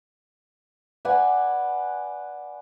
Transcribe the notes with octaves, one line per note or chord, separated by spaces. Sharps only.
B4 D5 F#5 G#5